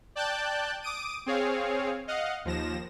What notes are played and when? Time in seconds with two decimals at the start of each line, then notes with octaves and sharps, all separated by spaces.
0.15 D5 G5 A5 F#6 G6 A6
0.82 D6 D#6 D7 D#7
1.26 C4 G#4 C#5 F5
2.08 D#5 F5 F#5
2.45 D#2 F3 A#6 E7